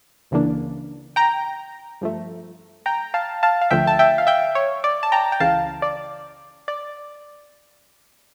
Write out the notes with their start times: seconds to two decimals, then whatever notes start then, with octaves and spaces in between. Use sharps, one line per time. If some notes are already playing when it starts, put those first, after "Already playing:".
0.31 C#2 C#3 E3 A#3 D4
1.16 G5 A#5
2.01 G2 F3 A3
2.86 G5 A#5
3.14 F5 A5
3.43 F5 A5
3.61 F5
3.71 D2 D3 F3 A3 E5 G5
3.87 A5
3.99 E5 G5
4.18 F5
4.27 E5 G5
4.55 C#5
4.84 D5
5.03 A5
5.12 G5 A#5
5.32 G5
5.40 C#2 C#3 E3 F5 A5
5.82 D5
6.68 D5